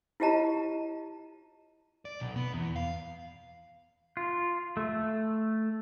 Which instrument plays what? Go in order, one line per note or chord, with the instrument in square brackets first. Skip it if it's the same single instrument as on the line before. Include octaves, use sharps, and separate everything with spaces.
[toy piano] E4 F4 G4 D#5 A5 A#5
[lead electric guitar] D5
B1
B3
E2
F5
[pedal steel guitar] F4
A3